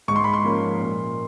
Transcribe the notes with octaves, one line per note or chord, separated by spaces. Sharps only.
G#2 C#6
C6
B5
C6
F3 A#3 C#4
A#2